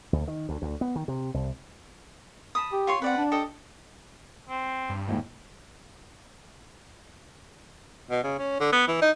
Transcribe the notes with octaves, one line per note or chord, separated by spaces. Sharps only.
D2
D#3
D2
D2
B3
D#3
C3
C2
A5 B5 D#6
G4
F4 C#5 C6
C4 B4 D5 F#5
D4
G4 A4 D#5
C4
G2
D#2 G#2 E3
B2
C#3
C#4
D3
B3
E3
D#4